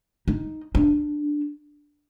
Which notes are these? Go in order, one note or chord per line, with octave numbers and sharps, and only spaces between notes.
D#4
D4